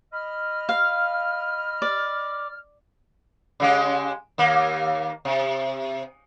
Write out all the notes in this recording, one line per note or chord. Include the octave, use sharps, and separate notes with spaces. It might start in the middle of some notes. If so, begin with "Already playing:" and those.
D#5 B5 F6
F5
D5
C#3 G#3 G4
D#2 A#3
C3